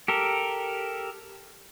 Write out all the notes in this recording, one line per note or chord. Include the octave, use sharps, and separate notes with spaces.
G4 A4 A#4